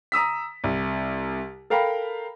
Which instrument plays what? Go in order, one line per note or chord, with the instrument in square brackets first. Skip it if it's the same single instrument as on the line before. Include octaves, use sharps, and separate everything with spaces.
[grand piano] A#5 D#6 E6 B6
C2
A4 A#4 F5 G5 A#5 B5